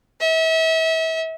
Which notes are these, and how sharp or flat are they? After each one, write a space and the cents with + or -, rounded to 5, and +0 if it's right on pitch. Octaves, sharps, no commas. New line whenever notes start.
E5 -35